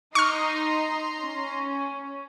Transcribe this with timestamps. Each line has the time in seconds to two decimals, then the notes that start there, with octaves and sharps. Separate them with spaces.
0.15 D#4 A#5 C6 C#6 F6
1.20 C#4